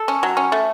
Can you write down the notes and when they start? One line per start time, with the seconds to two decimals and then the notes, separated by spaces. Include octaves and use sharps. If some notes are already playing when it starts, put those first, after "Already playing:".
Already playing: A4
0.08 C#4
0.23 F#3
0.37 C#4
0.52 A3